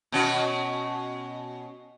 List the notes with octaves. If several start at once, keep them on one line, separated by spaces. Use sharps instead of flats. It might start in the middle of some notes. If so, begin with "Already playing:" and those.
B2 C#4 F#4